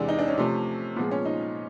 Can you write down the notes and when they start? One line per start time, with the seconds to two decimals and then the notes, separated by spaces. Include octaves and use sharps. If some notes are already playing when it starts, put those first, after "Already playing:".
Already playing: E2 C3 E3 G#3 D4
0.09 D#4
0.19 D4
0.28 C#4
0.38 C3 F3 A3
0.96 A#2 F3 G#3 B3
1.11 C#4
1.26 D#4